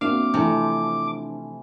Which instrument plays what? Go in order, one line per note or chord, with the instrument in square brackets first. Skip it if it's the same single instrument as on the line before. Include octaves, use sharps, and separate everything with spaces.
[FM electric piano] A#3 D4 [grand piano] C4 F#4 E5 [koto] F5 [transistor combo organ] D6
[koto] C3 F3 [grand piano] E3 A3 [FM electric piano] D4